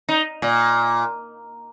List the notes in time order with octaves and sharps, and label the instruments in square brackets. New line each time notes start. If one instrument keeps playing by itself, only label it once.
[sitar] D#4
A#2